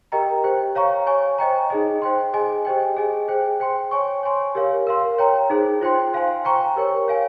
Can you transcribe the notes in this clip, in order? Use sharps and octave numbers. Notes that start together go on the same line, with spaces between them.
G4 A#4 D#5 G5 A#5
G4 C5 G5
C#5 F5 A#5 C#6
C#5 G#5 C#6
C5 D#5 G5 A#5
D#4 G#4 D#5
C5 G5 C6
G#4 D#5 G#5
G4 C5 D#5 G5
G#4 D#5 G#5
G#4 C5 G5
C5 G5 C6
C#5 G#5 C#6
C#5 G#5 C6
G4 A#4 C#5 F5
A#4 F5 C6
C#5 G5 A#5
D#4 G#4 C5
F4 C5 G5 C6
C5 F5 G#5 C6
C5 G5 A#5 C#6
G4 A#4 C#5 G5
C#5 F5 G#5